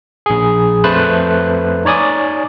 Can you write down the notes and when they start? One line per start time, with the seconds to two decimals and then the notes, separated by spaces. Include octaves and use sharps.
0.26 A#1 G#4
0.84 F2 A3 B4 C5 A5 F#6
1.85 D#4 C#5 D5 G#5 D#6